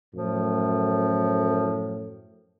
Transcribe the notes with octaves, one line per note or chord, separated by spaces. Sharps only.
F#2 A2 F3